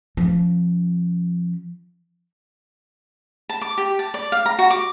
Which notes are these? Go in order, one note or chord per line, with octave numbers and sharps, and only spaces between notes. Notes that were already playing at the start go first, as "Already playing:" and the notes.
F3 C#4
A5
D6
G4
A5
D5
F5
A#5
F#4
D6